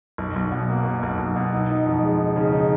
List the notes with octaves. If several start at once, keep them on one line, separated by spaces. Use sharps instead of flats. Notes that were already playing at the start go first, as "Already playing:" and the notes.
B1
B1
B2
A#3
B2
B1
B1
B2
D#4
D#4
F2
G#3
D#4
C#3
D#4